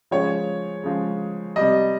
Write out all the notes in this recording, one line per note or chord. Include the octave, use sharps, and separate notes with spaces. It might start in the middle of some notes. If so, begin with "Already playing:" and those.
C#3 F3 G#3 C#5
C#3 F3 G#3
C3 G3 D#5